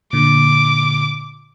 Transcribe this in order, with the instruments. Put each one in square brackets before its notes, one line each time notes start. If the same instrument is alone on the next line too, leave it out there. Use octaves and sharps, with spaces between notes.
[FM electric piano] A#2 D3 [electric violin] D6